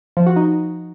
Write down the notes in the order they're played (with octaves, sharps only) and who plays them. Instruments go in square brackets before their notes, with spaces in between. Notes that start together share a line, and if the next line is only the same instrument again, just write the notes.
[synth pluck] F3
F#4
D#4